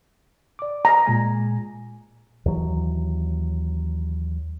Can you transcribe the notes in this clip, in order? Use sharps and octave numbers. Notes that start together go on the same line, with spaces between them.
D5 D6
A#5
A#2 G#3 G#5
D#2 E3 F#3